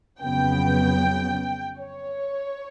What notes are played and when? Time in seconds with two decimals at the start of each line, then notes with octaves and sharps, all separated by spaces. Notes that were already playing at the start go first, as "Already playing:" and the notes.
0.21 F2 C#3 F#3 B3 G5
1.78 C#5